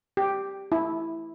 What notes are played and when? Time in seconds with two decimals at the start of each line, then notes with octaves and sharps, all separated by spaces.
0.17 G4
0.72 E4